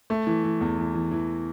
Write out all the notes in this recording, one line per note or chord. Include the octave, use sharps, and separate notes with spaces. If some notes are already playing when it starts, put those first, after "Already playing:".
A3
E3
E3
E2
E3
E3
E3